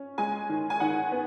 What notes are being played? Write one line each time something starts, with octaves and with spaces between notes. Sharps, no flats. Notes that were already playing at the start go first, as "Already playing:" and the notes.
Already playing: C#4
G#3 G#5
D#3
G#5
D#3 F#5
B3